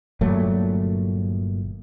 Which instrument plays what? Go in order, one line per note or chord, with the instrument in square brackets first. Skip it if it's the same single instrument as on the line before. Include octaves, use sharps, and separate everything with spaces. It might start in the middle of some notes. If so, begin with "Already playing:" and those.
[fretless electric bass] G1 A#2 F#3 A3